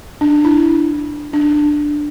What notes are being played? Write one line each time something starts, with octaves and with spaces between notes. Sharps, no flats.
D4
E4
D4